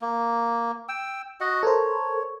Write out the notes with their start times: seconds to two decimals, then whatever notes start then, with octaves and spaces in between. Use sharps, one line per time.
0.02 A#3
0.89 G5 E6
1.40 F#4 D#5 F#5
1.63 A4 A#4 C5 C#5